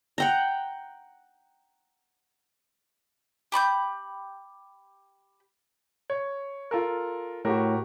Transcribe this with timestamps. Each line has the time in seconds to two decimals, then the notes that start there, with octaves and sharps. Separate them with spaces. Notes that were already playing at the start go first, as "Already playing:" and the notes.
0.18 F#5 G5 A#5
3.52 G4 B5 C#6 G6
6.10 C#5
6.71 F4 A4 A#4
7.45 A2 F#4 G4 A#4